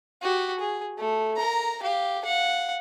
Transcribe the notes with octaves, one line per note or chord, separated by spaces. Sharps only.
F#4 G4
G#4
A3
A#4 A#5
G4 F5
F5 F#5